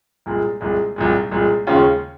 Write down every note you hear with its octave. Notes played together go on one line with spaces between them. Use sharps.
C2 A#2 G#3
C2 A#2 G#3
C2 A#2 G#3
C2 A#2 G#3
D#2 C#3 G#3 C#4 F4